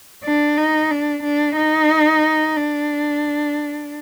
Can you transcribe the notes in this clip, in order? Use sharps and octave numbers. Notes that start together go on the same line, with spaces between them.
D4
D#4
D4
D4
D#4
D4